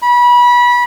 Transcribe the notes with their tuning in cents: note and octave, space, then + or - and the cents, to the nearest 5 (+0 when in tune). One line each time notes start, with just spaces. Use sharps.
B5 -25